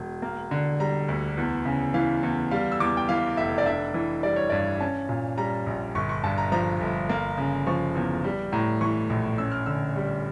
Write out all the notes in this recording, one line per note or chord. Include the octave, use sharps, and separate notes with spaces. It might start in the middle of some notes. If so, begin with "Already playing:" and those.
Already playing: E1
A#3
D3
G3 A#5
D2
E2
C#3
E3 F5
E2
G3 F5
E6
E2 D6
G5
E3 F5
F1 E5
D5
D4 E5
E3
G3 D5
C#5
G2 D5
C#4 A5
A#2
G3 A#5
A#1
G1 C#6
C#6
G2 A5
A#5
F3 A#5
G1
A#3
C#3
F3 C#6
E2
G3
A2 A#5
E3 C#6
A#1
C#4 E6
F6
D3 E6
G3